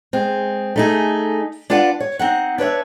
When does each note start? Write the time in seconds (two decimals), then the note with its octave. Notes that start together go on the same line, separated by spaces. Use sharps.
0.13 G#3 C4
0.76 A3 D#4 G#4
1.70 D4 F4 B4 D5 F#5
2.00 C#5
2.19 C4 D#4 F#5
2.58 D4 B4 C#5 E5